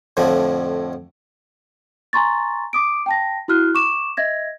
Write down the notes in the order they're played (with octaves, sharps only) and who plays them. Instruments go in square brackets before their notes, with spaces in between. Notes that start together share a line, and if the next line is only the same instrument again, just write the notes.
[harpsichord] F2 A2 D3 F3
[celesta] G#5 A#5 C6 C#6 A6
D6 D#6 D7
G5 A5 A#6
E4 F#4 F6 F#6
C#6 D6 E7
D#5 E5 G#6 A#6